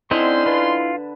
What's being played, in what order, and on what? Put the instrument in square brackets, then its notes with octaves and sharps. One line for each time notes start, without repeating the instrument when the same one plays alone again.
[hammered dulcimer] D3 [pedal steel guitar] C4 C5 [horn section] C#4 D#4 C6 [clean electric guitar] E4 D#5
[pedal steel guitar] F4 [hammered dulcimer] B4 A5